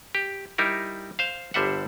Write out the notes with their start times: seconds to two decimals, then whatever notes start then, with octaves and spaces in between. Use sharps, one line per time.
0.15 G4
0.58 G3 D#4 E4 A#4
1.19 C5 F5
1.54 G1 D3 G3 C5 E5 F#5